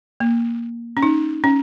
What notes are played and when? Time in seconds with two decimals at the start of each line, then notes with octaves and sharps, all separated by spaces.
0.20 A#3
0.97 C#4
1.03 D#4
1.44 C#4